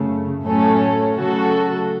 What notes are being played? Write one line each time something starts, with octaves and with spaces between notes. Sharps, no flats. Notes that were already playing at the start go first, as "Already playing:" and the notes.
Already playing: F#2 C#3 A3
A2 F#3 A3 C#4 A4
C#3 F#3 A3 F#4 A4